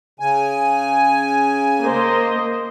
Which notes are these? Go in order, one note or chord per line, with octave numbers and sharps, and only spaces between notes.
C#3 G#5
A#3 C5 D#5